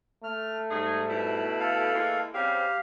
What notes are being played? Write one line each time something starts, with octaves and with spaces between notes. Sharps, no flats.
A3 F6
G#2 G3 D#4 G#4
B2 E4
A4 F5
E3 G#3 A#3
C#3 G3 C4 G4 F5